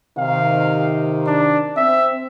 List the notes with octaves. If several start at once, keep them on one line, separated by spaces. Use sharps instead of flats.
C3 D#3 F5
D4
C4 E5